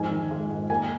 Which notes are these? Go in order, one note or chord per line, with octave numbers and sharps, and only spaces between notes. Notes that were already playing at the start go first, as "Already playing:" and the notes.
Already playing: F2 G#2 G#5
D#3
G#3
G#2
A#3 G#5